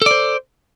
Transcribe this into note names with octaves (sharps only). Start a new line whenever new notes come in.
A4 C5 D5